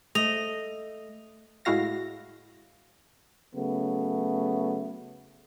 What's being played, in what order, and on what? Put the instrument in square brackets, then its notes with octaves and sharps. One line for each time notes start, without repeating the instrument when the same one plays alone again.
[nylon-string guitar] A3 [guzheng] D#5 [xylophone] F7
[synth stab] A2 G#3 E4 F#4 F5 A#6
[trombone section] C#3 F#3 A3 B3